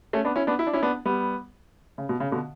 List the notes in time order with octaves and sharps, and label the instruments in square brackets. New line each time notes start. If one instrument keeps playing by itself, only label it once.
[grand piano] A3 C#4
B3 D4
C#4 E4
B3 D4
E4
D4
C#4 E4
B3 D4
G3 B3
C#3
B2
C#3
B2 D3